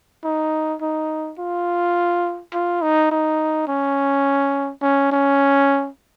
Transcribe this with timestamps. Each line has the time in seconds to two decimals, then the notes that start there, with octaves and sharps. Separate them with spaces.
0.24 D#4
0.81 D#4
1.39 F4
2.53 F4
2.82 D#4
3.11 D#4
3.68 C#4
4.82 C#4
5.12 C#4